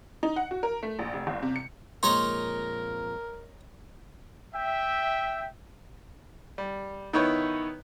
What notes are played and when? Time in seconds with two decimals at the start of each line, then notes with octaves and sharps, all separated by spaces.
0.23 D#4
0.36 F#5
0.51 F#4
0.63 A#4
0.83 A3
0.99 A#1
1.13 F1
1.27 G1
1.42 C3
1.56 C#7
2.03 F2 A#2 G#3 D#4 A#4 C#5 D#5 C6
4.54 E5 G5
6.58 G3
7.13 D#3 B3 D#4 E4 B4 C#5